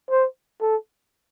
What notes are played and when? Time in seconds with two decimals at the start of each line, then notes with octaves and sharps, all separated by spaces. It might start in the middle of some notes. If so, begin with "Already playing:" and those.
0.10 C5
0.61 A4